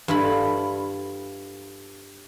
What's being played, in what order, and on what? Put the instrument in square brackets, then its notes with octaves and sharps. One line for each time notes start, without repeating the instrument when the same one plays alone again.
[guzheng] G2 E4 F4 A4 B5